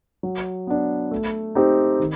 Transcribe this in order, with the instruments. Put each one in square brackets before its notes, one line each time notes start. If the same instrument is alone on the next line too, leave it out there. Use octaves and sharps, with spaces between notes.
[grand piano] F#3
B3 D4
A3
C4 D#4 G4
D#3